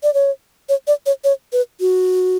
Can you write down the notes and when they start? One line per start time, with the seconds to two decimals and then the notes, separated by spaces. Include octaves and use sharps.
0.03 D5
0.14 C#5
0.69 C#5
0.87 D5
1.06 C#5
1.24 C#5
1.53 B4
1.80 F#4